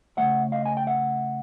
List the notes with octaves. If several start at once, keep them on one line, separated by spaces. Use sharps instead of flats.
C#3 F3 A3 E5 F#5
D#5 F5
G#5
G5
E5 F#5